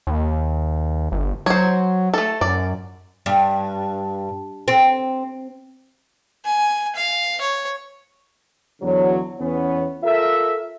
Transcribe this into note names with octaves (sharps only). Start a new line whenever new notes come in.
D#2
G1
F#3 C5 C#5
A3 A4
F#2 D5
G2
C4
G#5
F5
C#5
E2 D3 F#3
E2 B3 C#4
F4 A4 A#4 E5